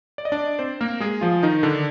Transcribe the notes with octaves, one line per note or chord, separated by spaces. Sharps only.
D5
D#5
D4 D5
C4 C5
A#3 A#4
G#3 G#4
F3 F4
D#3 D#4
D3 D4